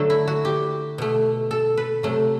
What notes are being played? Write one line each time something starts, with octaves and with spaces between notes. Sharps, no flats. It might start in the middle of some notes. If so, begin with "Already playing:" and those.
Already playing: D3 F#3 A3 A4
E4
F#4
G4
B2 A3
A4
B4
C3 F#3 A3